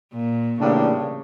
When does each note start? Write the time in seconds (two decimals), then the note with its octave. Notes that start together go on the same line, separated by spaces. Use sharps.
0.13 A#2
0.60 A2 C#3 E3 G3 A#3 D4